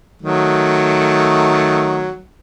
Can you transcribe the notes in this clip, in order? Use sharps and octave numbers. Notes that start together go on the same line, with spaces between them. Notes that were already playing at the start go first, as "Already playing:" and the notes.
D#3 F#3 A3